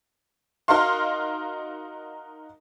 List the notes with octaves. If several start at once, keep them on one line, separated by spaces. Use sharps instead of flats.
D#4 F#4 A#4 F5 C6